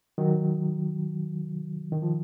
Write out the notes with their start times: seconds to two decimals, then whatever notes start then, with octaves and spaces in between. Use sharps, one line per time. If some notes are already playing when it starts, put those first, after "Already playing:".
0.18 D#3 F#3
1.92 D#3
2.02 F3